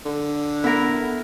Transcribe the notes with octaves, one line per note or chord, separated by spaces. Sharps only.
D3
B3 E4 A#4